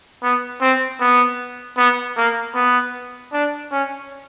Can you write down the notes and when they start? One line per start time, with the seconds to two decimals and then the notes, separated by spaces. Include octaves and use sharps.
0.23 B3
0.61 C4
1.01 B3
1.77 B3
2.17 A#3
2.55 B3
3.33 D4
3.72 C#4